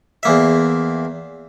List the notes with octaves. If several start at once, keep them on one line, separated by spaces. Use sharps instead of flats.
E2 A#3 E5